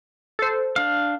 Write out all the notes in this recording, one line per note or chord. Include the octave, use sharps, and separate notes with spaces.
A4 C5
D4 F5